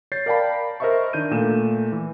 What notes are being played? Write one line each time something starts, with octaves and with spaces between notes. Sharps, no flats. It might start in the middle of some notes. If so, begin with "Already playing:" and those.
C#5 G6 A6 C7
A#4 D5 F5 G5 A5 B5
A#4 C5 D#5 E5 B5 C#6
D#3 D4 G6 D#7
A#2 A3 E7
E3